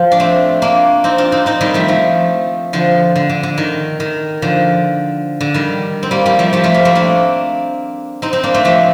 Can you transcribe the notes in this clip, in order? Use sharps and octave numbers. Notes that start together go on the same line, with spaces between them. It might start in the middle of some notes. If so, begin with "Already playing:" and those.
Already playing: F3
D4
A3 C4
A#3 D4
C4 D#4
D4 F4
C4 D#4
C4 D#4
D#3 G3
F3 A3
F3 A3
D3 F3
D3
D3
D3
D#3
D#3
D3 F3
D3
D#3 G3
C4
G3 A#3
G3 A#3
F3 A3
F3 A3
F3 A3
G3 A#3
A3 C4
A#3 D4
C4 D#4
C4 D#4
A#3 D4
A3 C4
F3 A3